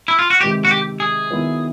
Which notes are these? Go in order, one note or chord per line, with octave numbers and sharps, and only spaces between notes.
E4
F4
F#4
C3 D#3 G#3 G4
F#4
G4
G#4
D#3 F#3 B3 E4